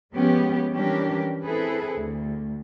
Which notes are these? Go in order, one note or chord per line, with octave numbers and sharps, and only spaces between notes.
F3 G#3 B3 C#4 G4
E3 G3 C#4 D4 G4 A#4
C4 E4 G#4 A4 B4
D2